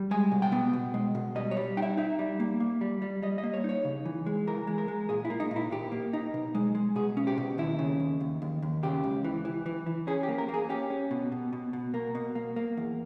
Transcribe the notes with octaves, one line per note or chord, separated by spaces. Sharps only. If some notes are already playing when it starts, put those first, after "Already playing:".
Already playing: G3
G#3 G#5
B2
G5
B3
B2
G#3
B2
G3 D#5
C#5
G3
D#4 G5
E5
D#4 E5
G3
A#3
A#3
G3
G3
G3 D#5
D#5
A#3
C#5
D#4 C#5
C#3
E3
G#3
E3 A#4
G#3
A#4
G#3
A#2 G#4
E4
A#3
D#4
A#2
E4
A#2 G4
A#3
D#4
B2
G#3
G#3
B2 G#4
C#4
G4
B2
D#2 E4
C#3
D#2
D#2
D#2
D#2
C#3 G4
C#2
E3
E3
E3
E3
C#4 G#4
G4
A#3
A#4
A#3
G#4
C#4 G4
C#4
B2
B2
B2
B2
A#3 A#4
B2
A#3
A#3
E2